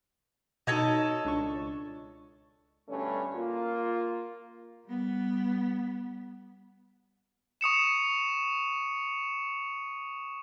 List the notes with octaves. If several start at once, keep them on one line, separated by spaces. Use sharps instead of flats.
B2 D#4 A4 C#5 D#5
C#2 D4 C#6
G2 B2 D3 A3 C#4
A#3 F4
G3 B3
C#6 D#6 C#7 E7